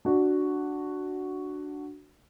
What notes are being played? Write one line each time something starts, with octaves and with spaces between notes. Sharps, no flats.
D4 F#4